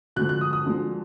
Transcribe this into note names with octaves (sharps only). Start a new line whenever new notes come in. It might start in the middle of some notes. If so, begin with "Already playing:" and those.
D2 D3 F3 G#3 F#6
F#6
D#6
D#6
D2 D3 F3 G#3